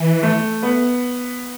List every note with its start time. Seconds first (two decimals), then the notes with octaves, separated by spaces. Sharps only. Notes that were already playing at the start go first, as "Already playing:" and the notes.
Already playing: E3
0.23 A3
0.63 B3